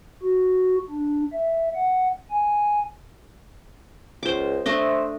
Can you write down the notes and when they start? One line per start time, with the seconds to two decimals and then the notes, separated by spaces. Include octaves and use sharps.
0.23 F#4
0.90 D4
1.32 E5
1.75 F#5
2.30 G#5
4.23 C#2 C5 D6
4.66 A3 D4 C5 D#5 E5